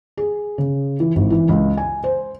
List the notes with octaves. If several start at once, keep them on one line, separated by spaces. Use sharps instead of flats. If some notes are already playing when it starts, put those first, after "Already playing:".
G#4
C#3
E3
G#1
E3
C#2
G#5
C5